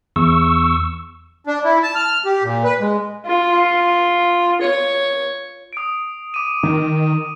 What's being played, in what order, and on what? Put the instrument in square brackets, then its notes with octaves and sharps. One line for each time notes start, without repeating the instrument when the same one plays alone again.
[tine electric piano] E2 [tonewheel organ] C#6 E6
[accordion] D4
E4
A5
F6
G4
A#2
B4
G#3
[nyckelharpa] F4
C#5
[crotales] D#6 D7
D6 D#7
[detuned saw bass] D#3